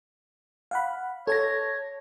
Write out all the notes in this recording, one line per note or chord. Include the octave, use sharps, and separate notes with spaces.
F5 F#5 B5
A4 C#5 A5 A#6